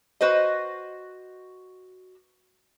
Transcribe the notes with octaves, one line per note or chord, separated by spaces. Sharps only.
F#4 B4 C5 D#5